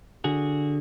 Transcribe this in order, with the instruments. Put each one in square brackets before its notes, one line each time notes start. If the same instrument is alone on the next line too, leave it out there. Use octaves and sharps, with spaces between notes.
[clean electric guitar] D3 F#4 G#4